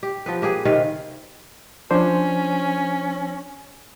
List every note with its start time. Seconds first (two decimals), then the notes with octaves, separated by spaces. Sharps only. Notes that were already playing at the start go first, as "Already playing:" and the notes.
0.03 G4
0.26 F3 B3 B4
0.42 A#3 G4 G#4 B4
0.65 C3 D#3 B4 F5
1.91 F3 C#4 D4 C5